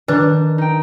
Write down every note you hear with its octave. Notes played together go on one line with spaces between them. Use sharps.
D#3 D4 B4
D#4 G5